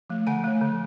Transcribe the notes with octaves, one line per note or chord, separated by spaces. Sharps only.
F3 A3
D3 F#5 G#5
F3 A3
D3